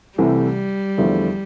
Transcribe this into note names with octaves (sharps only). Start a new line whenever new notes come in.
C2 C3 E3 G3 A3
E2 D3 F3 A3 E4